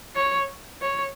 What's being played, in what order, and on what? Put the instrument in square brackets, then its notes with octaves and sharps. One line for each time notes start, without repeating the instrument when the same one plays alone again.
[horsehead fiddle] C#5
C#5